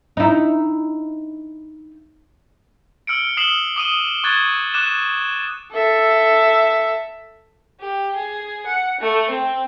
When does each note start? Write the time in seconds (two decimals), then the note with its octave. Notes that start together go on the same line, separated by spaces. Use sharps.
0.17 D#4 E4
3.07 E6 F6 C#7 D7
3.37 D#6 F6 C7 E7 F#7 G7
3.76 D6 D#6 D#7 G7
4.24 C#6 D6 F#6 G#6 A6
4.74 D6 F#6 D#7 E7
5.72 A4 E5
7.80 G4
8.16 G#4
8.66 F#5
9.01 A3
9.30 C4